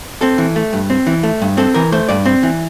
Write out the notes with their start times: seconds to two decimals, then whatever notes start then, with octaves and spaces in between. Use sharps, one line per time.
0.21 C4 A4
0.38 E3
0.56 A3
0.73 G2
0.90 C4
1.07 E3
1.23 A3
1.42 G2
1.57 C4 A4
1.74 E3 A#4
1.92 A3 C5
2.09 G2 D5
2.26 C4
2.43 E3